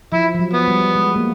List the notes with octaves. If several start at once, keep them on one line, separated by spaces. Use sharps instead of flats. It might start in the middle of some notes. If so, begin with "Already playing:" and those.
F3 E4
F3
F#3
B3
G3
G#3
A#3